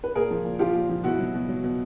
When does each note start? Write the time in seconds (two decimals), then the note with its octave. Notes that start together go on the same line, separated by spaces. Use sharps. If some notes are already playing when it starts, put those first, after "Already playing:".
0.04 B4
0.15 A#2 G#4 A#4
0.31 F3
0.44 A#2
0.59 F3 F4 G4
0.75 A#2
0.89 F3
1.04 B2 E4 F#4
1.19 F#3
1.34 B2
1.49 F#3
1.64 B2